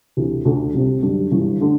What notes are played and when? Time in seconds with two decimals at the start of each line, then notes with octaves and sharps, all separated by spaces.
0.17 D2 C3 E3
0.45 D2 D3 A3 D4 A4
0.74 C2 C3 G3 C4
1.03 F#2 D3 G3 D4
1.31 G1 G2 E3
1.61 D3 A3 D4